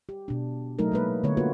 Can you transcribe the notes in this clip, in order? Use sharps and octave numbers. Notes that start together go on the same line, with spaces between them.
G4
B2 D4
F#3 A3 D#4 A#4
G#3 A#3 B4
D3 A3 B3 C#5
A#3 B3 F4 F#4 B4